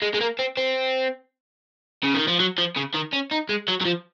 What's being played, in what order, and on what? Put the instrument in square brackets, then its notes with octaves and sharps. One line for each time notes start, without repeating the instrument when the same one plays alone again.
[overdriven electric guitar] G#3
G#3
A#3
C4
C4
C#3
D#3
F3
F#3
F3
C#3
D#3
C#4
D#4
G#3
F#3
F#3
F3